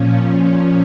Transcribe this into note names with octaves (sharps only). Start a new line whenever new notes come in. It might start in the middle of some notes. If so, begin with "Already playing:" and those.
Already playing: A#2 F3 C#4